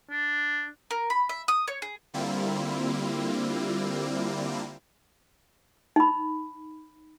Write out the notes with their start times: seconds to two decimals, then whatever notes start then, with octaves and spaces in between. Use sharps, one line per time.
0.10 D4
0.91 A#4
1.10 B5
1.29 E5
1.48 D#6
1.68 C#5
1.82 G#4
2.14 D3 G3 A#3 C4 E4 F4
5.96 D#4 B5